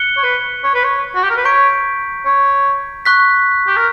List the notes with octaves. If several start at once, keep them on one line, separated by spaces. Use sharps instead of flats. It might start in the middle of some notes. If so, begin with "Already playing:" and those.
Already playing: F#6 C#7 G7
C#5
B4
C#5
B4
C#5
F#4
G4
A#4
B4
C#5 A#5 C#6 G6 B6 D7
C#5
C#6 F#6 B6
G4
A#4